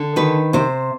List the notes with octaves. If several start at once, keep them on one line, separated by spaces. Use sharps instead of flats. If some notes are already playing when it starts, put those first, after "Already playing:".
Already playing: D3
D#3 B4
C3 C5